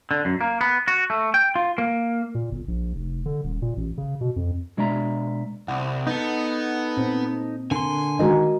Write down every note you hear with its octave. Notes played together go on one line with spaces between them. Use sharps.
D3
F#2
A#3
B3
F#4
A3
G5
F4
A#3
A#2
G1
A#1
F1
D3
D#1
A#2
A1
C#3
B2
F2
B2 G#3 D4 D5 E5 A#5
C2 F#5
B3 D#4 A4
A#2 C4
D3 A#4 G#5 C6
D#3 G#3 F#4 G#4 A#4 D#5